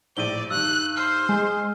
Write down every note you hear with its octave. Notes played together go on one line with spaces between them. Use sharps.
A#1 A2 C5 D5 D#7 G7
G2 D#3 E6 F#6
C5 F6
G#3 G#4